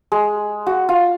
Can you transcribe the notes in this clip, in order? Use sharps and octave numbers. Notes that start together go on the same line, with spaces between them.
G#3
F#4
F4